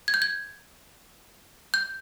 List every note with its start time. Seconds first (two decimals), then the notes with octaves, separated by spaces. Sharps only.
0.08 G#6
0.14 G6
0.22 G#6
1.74 G6